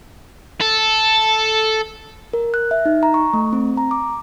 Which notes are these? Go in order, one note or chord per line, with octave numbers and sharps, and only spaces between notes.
A4
A#4
F#6
E5
D#4
A#5
C#6
A3
C4
A#5
D6